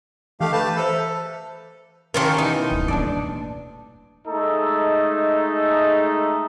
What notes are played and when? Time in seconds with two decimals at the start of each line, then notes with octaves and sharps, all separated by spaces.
0.41 E3 A3 G4 F5
0.53 B4 A5 G6
0.77 A4 C5 E5
2.14 D#3 C#4 F4 G4 A4 A#4
2.39 B2 E3 D#4
2.71 D1 F#2
2.88 D#1 A2 D4 A4 D5
4.26 G#3 A3 D#4 A4